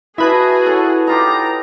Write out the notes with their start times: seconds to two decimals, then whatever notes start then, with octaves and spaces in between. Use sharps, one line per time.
0.18 E4 F#4 G#4 B4 D#5 A5
0.66 A4 C#5 F#5
1.07 D#4 F4 G4 A#5